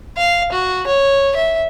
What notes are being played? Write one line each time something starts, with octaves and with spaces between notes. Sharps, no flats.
F5
F#4
C#5
E5